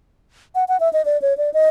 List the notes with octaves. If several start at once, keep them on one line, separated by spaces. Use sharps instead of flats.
F#5
F#5
E5
D#5
D5
C#5
D5
D#5